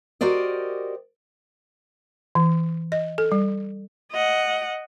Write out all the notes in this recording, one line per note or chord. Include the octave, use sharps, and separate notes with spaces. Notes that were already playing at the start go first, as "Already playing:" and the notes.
F#4 G4 A#4 C5 D5 D#5
E3
D#5
A4
G3
D#5 F#5